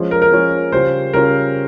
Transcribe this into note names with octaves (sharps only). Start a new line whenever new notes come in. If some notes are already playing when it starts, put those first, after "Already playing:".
Already playing: F3 G#3 C#4 F4
A#4
A#4
F3 G#3 C#4 F4
C#3 G3 C#4 F4 C5
C#3 G3 C#4 F4 A#4